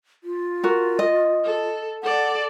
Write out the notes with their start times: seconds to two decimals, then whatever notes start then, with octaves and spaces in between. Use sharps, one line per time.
0.24 F4
0.64 F#4 A#4
0.99 D#5
1.44 A4
2.03 A4 D5 F#5